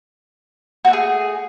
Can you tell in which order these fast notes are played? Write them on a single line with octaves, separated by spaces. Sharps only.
F#4 C4 A3 G#4